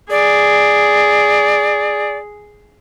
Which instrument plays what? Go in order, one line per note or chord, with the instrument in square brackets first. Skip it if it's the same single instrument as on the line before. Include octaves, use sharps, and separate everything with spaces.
[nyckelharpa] G#4 [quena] D5